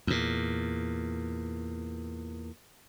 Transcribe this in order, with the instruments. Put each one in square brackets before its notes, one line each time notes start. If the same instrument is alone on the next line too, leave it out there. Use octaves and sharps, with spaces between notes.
[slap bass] E2 A#2